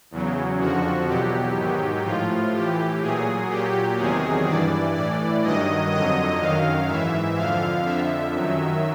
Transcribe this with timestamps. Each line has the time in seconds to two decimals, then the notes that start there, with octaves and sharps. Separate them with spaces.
0.11 E2 C#3 F#3
0.59 F2 D3 F3 F#4
1.07 E2 B2 F#3 G4
1.56 G#2 D#3 F#3
2.04 A2 F3 F4
2.53 A2 E3 G4
3.01 A#2 F#3 G#4
3.49 A#2 F#3 G4
3.98 E2 C3 D#3 F#3 G#4
4.47 G2 E3 D5
4.95 A2 E3 D5
5.43 G2 D#3 F#3 D#5
5.92 F2 D3 F#3 D#5
6.39 F#2 D#3 F#3 F5
6.88 G#2 E3 E5
7.36 F2 D3 F3 F5
7.85 F2 D3 F3 E5
8.34 F#2 D#3 F#3